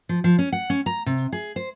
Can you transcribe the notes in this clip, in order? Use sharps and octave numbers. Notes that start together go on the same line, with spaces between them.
F3
F3
C#4
F#5
C#4
A#5
C3
G#4
C5